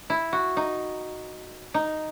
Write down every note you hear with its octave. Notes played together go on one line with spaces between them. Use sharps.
E4
F#4
D#4
D#4